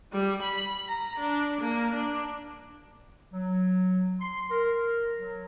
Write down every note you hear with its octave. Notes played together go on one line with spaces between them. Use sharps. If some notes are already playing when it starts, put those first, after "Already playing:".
G3
B5
A#5
D4
A#3
D4
F#3
C6
A#4
F#3